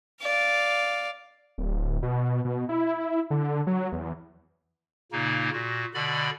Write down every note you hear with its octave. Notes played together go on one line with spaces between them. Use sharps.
D5 F5
D1
B2
B2
E4
D3
F#3
E2
A#2 C#3 A#3 D#4
A#2 F#4
B2 D3 D5 B5